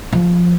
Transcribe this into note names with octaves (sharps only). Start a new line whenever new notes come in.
F3